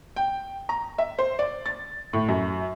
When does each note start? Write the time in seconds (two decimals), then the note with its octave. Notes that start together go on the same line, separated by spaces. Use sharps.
0.16 G5
0.69 A#5
0.98 E5
1.19 C5
1.39 D5
1.66 A6
2.13 A2
2.29 F#2